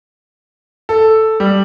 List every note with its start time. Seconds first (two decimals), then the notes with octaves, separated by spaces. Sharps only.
0.89 A4
1.40 G3